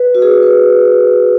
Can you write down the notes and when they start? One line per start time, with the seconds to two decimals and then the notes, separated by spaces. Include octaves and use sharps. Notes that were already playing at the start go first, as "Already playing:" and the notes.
Already playing: B4
0.15 F#4
0.22 G#4
0.43 B4